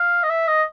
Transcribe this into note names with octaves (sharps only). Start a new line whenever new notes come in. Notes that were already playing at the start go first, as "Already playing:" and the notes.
Already playing: F5
D#5
E5
D#5